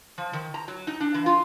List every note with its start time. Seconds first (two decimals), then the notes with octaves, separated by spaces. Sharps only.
0.18 F3
0.33 D#3
0.54 A#5
0.68 F#3
0.87 D#4
1.00 D4
1.14 E3
1.26 F4